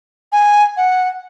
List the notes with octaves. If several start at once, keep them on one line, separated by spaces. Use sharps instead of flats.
G#5
F#5